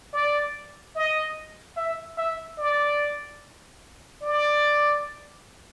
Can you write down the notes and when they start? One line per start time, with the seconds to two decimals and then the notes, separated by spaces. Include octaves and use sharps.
0.13 D5
0.95 D#5
1.77 E5
2.18 E5
2.59 D5
4.22 D5